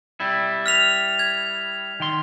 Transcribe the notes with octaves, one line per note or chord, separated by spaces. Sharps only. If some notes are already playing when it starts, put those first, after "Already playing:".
G3 E4
F6 B6 F7
G#6
D#3 C6